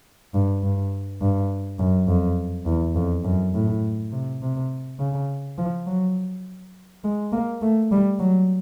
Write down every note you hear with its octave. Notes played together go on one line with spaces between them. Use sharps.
G2
G2
G2
F#2
F2
E2
F2
F#2
A2
C3
C3
C#3
F3
F#3
G#3
A#3
A3
G3
F#3